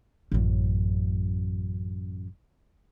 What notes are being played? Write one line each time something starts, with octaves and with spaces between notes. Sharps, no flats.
A1 F#2